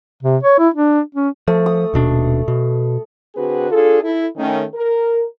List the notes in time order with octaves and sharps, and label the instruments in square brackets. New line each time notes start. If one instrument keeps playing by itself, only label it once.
[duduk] C3
C#5
E4
D4
C#4
[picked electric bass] F3 [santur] A3
[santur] D#6
[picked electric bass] D#1 B2 D4
B2
[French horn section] D3 C4 D4 F#4 G#4 B4
D4 F4 G#4 A4
E4 A4
D#3 A3 C#4
A#4